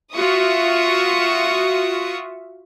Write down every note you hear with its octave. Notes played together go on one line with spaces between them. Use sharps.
F4 F#4 E5 C#6 D#6